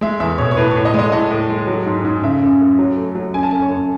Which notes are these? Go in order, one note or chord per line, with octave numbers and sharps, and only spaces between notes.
G#3 E5
E2 E5
B2 C#5
C#5
A2 B4
A2 C#5
D#5
G#3
D#5
A2 D#5
A2
G#3
F#3
G#2
G#2
C#3 E5
F#2
F#2
F#3
A3
F#3
F#2 G#5
A5
F#2 G#5
C#5
F#2